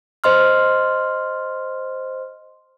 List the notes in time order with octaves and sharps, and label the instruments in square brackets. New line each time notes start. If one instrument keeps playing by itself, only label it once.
[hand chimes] C5 D#5 C6 F6